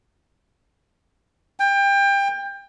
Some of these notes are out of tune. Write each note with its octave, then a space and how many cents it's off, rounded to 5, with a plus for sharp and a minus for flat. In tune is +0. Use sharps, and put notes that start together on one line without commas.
G5 +25